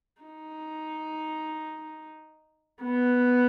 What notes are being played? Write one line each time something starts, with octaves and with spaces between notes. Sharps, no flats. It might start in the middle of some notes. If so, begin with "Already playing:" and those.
D#4
B3